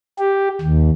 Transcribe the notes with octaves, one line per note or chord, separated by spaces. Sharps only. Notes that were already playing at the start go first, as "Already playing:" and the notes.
G4
D#2